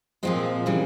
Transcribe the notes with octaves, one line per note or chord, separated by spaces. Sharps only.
A#2 F3 G#3 C4
C#3 E3 G3